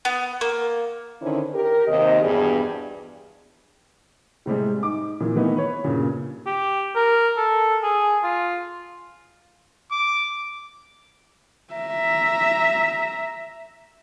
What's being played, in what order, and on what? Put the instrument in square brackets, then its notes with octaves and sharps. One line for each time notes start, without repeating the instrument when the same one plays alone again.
[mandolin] B3
A#3
[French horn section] D3 D#3 C#4 D4 E4 C5
G4 A#4
D#2 C3 D#5
E2 G2 B2 D4 G#4
[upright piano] A2 C3 G3 G#3
D#4 D6
A#2 E3 A#3
D#3 E3 A3 B3 D#4
B4 C#5
G2 A#2 C#3
[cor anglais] G4
A#4
A4
G#4
F4
[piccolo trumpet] D6
[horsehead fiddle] E5 A#5